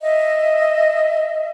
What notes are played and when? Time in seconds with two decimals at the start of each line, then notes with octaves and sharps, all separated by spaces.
0.01 D#5 E5